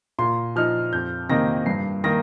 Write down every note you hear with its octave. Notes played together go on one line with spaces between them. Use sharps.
A#2 C6
F3 D#4 F6
F2 G6
C3 D#3 A#3 D#4 A#6
G2 C7
D#3 A#3 A#6